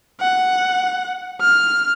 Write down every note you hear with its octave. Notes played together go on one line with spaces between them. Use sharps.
F#5
F6